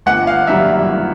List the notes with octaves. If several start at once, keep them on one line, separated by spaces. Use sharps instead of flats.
G1 F#5
F5
F#2 D#3 G3 A#3 E5